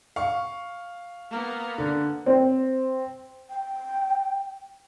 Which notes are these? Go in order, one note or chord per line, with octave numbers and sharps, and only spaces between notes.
F5 C#6
A#3 B3
D3
C4
G5